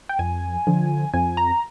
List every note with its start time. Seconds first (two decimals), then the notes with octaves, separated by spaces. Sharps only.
0.09 G5
0.19 F2 G#5
0.67 D3 F3
1.14 F2 G#5
1.37 A#5